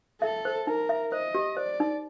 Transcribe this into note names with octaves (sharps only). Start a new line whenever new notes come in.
A4 E5
C5
D#4 A#4
E5
C5 D#5
G4
C5 D5
D#4